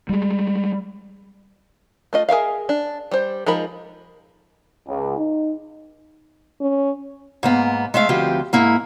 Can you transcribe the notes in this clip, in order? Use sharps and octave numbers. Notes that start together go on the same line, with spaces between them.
G3 G#3
A3 F4 D#5
G#4 A#4 E5 F5
D4
G3 C5
F3 G#3 D#4 A#4 B5
C#2
D#4
C#4
G#2 A#3 B3
G#3 A3 E5 F5
D2 F3 C4 G4 B4
G#2 A#3 E4